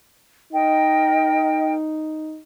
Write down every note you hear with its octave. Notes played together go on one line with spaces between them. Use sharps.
D#4 A#4 D#5 G5